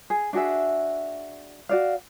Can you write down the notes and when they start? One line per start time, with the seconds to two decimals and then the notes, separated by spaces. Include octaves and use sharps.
0.10 G#4
0.33 D4 F#4 G#4 E5
1.69 F#4 D5 F5